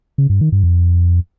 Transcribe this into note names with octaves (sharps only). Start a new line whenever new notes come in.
C#3
G2
D#3
G2
F2